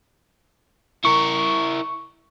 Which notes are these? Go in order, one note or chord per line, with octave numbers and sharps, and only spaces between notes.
E4 A#4 C#6